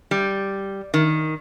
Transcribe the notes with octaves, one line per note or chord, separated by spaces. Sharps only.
G3
D#3